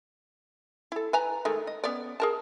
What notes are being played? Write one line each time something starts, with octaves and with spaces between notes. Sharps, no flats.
E4 A4
B4 G#5 A#5
D#3 G#3 A3
D#5
B3 C#4 D5
G#4 A#4 A5